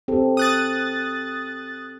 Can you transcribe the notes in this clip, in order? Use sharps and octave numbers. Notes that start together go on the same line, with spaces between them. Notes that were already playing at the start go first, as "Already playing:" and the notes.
C4 G4 A4
D#6 F#6 A6